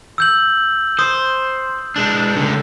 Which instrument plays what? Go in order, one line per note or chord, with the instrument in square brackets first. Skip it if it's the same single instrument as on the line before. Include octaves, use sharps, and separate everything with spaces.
[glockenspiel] E6 G6 F#7
[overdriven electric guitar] C5 [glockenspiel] D#6
[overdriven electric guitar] G#3 D4
C#2 D3